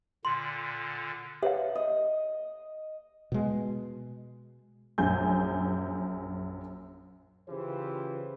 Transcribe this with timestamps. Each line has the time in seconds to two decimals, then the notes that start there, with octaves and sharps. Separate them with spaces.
0.25 A#2 D3 C6
1.43 G4 B4 C#5 E5 F5
1.75 D#5
3.32 B2 G#3
4.98 A#1 F#2 G#5 G6
7.49 C#3 E3 F4 G4 C5